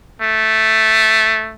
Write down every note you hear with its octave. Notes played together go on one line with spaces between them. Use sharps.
A3